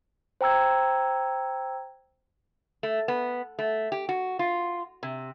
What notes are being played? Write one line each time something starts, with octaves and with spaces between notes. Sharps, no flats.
C5 G5 A#5 E6 G#6
A3
B3
A3
G4
F#4
F4
C3